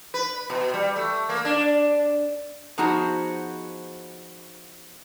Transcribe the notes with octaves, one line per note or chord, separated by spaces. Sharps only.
B4
B2
G3
A3
A#3
D4
F3 B3 D#4 F#4 G#4 C5